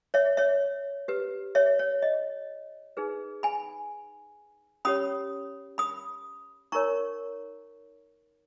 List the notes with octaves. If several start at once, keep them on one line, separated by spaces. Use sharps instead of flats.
C#5 E5
C#5 E5
G4 B4
C#5 E5
C#5
D#5
D#4 G#4 B4
G#5 B5
C#4 G4 C#5 B5 D#6
B5 D#6
D#4 A#4 C#5 A#5 C#6